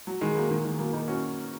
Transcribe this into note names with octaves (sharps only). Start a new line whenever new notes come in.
F#3
D#3 G#3
F#3 A#3
D#3 G#3
D#3 G#3
G#3
F#3 A#3
A#3 D#4
C#4 F#4